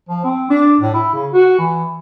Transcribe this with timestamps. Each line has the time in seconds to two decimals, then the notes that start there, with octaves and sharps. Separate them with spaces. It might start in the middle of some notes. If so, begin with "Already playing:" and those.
0.09 F3
0.24 C4
0.50 D4
0.81 A2
0.94 E4
1.14 C#3
1.33 F#4
1.58 E3